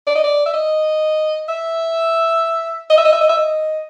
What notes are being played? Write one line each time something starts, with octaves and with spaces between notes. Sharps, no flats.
D5
D#5
D5
E5
D#5
E5
D#5
E5
D#5
E5
D#5
E5
D#5